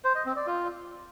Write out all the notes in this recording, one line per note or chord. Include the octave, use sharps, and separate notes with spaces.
C5
D#5
C4
D5
F4